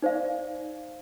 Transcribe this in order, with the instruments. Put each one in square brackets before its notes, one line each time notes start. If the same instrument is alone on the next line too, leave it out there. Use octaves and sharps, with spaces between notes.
[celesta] D#4 C5 D5 F5